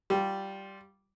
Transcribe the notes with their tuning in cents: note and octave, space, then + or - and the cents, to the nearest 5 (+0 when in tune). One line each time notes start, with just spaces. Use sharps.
G3 -10 F4 +0